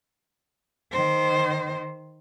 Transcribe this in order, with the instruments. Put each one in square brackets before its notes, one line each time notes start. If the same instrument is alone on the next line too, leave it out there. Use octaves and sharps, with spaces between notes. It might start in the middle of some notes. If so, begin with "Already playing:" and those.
[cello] D#3 C5